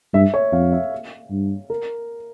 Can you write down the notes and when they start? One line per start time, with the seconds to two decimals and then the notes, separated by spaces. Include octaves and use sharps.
0.14 G2 E5
0.34 C#5
0.53 F2 F5
0.72 E5
1.31 G2
1.70 A#4